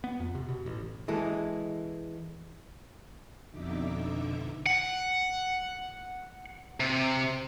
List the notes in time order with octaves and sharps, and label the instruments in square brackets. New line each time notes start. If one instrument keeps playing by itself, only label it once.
[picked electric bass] B3
F2
C3
B2
A1
[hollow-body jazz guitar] E3 G#3 A4
[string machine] F2 B2 D3 D#4 E5 D6
[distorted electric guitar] F#5
C3